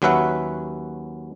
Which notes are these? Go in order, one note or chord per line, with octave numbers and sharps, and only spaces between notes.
D#2 F#3 C#4 B4 E5 F#5